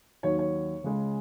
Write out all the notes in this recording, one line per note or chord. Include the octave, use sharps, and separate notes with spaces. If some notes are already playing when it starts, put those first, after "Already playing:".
D#2 D#3 F#3 C#5
C#5
C#2 C#3 G#3